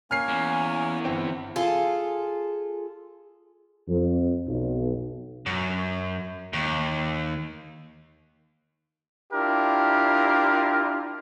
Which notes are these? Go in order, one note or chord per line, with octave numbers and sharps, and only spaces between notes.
A#3 C#4 G#5 F6 C7
E2
G1 C4 G5
F4 G#4 A4
F2
B1
F#2
D#2
D4 E4 F4 G4 A#4